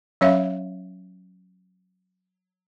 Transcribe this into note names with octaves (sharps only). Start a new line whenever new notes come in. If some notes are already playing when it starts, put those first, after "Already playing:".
F#3 C#4 C#5 E5 F5